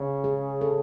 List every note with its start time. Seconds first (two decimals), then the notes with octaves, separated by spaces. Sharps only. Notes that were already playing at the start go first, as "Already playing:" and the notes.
Already playing: C#3
0.24 G#4
0.61 A4